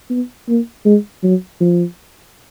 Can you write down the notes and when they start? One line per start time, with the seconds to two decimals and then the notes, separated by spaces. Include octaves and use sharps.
0.10 B3
0.48 A#3
0.85 G#3
1.23 F#3
1.60 F3